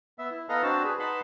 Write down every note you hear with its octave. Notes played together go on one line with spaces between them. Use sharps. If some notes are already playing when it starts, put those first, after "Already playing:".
B3 E5
E4
B3 A4 B4 D#5 F5 A#5
C4 D4 F#4 A5
G#4 B4
D#4 B4 F#5 A5 B5 C6